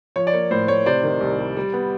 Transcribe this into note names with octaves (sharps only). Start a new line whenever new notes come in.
F3 C#5
D5
A#3 C#5
A2 C5
A2 C#5
C3 C5 D5
D#3
C2
G3
G3
B3